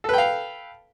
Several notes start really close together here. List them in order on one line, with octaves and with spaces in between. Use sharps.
A4 B4 G5 F5